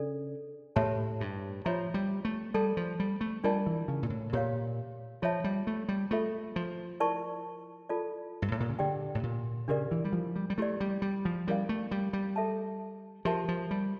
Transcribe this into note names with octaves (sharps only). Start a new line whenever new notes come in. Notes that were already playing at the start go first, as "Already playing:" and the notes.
Already playing: C#3 D4 A4 D5
A2 G4 C#5 E5 A5
G2
F3 F4 C#5 E5 A#5
G3
A3
G3 A4 D5 A5
F3
G3
A3
G3 D4 F4 A#4 D5 A5
E3
C#3
A#2
A2
A#2 G4 C#5 F5
F3 F4 C#5 E5 A5
G3
A3
G3
A3 F4 A4 E5
F3
E4 A#4 D5 A5 C#6
F4 A4 D5 A5
G2
A2
A#2
C#3
D3 G4 D5 G5
A2
A#2
C#3 D4 G4 A#4 D5
E3
G3
F3
G3
G3
A3 E4 G4 D5
G3
G3
F3
G3 C#4 E4 A#4 D5 F5
A3
G3
G3
A4 E5 A5
F3 G4 A#4 E5 A5
F3
G3